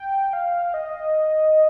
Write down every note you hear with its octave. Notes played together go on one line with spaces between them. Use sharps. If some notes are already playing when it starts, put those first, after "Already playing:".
Already playing: G5
F5
D#5